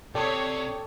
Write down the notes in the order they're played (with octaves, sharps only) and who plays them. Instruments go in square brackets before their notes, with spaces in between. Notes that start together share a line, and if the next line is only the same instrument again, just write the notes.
[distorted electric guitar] C3 [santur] A4 D6 D#6 [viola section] C#5 [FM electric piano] D5 G5